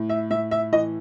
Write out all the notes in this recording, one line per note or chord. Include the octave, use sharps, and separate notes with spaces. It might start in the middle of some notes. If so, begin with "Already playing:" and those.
Already playing: A2
E5
A2 E5
E5
E3 D#5